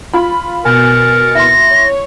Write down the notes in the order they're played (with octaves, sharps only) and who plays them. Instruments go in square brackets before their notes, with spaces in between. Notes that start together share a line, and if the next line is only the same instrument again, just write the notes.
[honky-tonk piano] F4 B5
[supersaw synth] B2 A6 C#7 [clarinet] A#4 [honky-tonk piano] G#5 G6
[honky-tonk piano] E4 C6 [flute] A#6
[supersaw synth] C#5